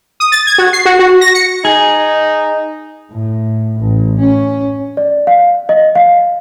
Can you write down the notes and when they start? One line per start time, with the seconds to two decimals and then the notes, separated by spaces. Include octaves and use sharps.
0.20 D#6
0.32 A6
0.47 G#6
0.58 F#4
0.73 C7
0.85 F#4
0.99 F#4
1.21 A#6
1.35 C#7
1.65 D#4 G#4
3.11 A2
3.80 A1
4.19 C#4
4.97 D5
5.27 F5
5.69 D#5
5.95 F5